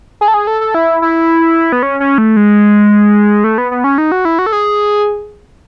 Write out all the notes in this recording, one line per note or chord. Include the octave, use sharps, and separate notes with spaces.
G#4
A4
G#4
A4
A4
E4
E4
B3
C#4
C#4
A3
G#3
A3
B3
B3
C#4
D#4
F#4
E4
F#4
A4
G#4